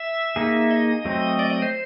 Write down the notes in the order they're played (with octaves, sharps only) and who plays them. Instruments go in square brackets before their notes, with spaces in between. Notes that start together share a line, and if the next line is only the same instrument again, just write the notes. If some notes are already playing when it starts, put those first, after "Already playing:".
Already playing: [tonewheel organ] E5
[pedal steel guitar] A#3 D#4 G#4
[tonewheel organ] D#5
[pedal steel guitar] F#3 A3 C4
[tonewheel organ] D5
D#5
C5